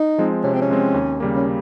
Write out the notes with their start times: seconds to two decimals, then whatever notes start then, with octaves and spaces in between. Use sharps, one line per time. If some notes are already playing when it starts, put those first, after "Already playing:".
Already playing: D#4
0.18 F3 G#3 C4
0.43 C3 C#4
0.53 C4
0.61 C#4
0.69 F3 G#3 C4
0.94 D#2
1.20 C#3 G3 A#3
1.36 C#4